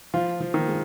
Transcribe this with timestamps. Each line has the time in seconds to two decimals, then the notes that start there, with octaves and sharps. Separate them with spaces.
0.14 F3 F4
0.40 F3
0.54 D#3
0.68 G#3